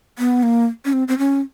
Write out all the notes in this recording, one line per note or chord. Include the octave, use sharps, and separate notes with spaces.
B3
A#3
C#4
C4
C4
C#4